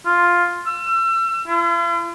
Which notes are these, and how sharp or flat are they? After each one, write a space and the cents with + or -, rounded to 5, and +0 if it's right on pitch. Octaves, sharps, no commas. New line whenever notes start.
F4 +5
E6 +35
F4 -45